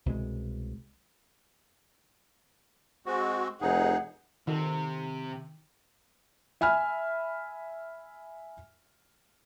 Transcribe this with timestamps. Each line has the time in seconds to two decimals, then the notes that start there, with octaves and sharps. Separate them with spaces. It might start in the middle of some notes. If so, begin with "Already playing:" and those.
0.06 C2 B2 G#3
3.06 G#3 C4 F#4
3.61 F1 D#4 G#4 F#5
4.47 C3 D#3 A4
6.61 E5 G#5 B5 F6